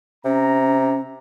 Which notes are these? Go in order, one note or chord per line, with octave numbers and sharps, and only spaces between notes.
C3 C#4 A#5